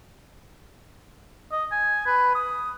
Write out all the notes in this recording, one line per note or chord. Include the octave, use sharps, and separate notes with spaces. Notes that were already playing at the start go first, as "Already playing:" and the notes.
D#5
G#5
B4
D#6